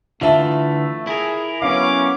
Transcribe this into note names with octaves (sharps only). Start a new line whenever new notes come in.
D3 E3 A3 F4 E5 A5
E4 G#4 A#4
F#3 B3 C#4 F5 D6